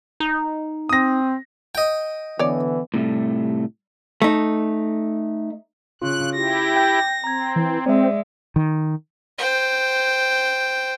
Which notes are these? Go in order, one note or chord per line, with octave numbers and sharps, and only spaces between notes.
D#4
C4 D#6 A#6
D#5 G5
D3 E3 B3 C#5 D5
A2 C3 G3 A3
A3 D#4
C#3 F4 F#6
E4 G4 A#6
G5 G6
C4 A#5 G#6
E3
G#3 C4 D5 E5
D#3
C5 G5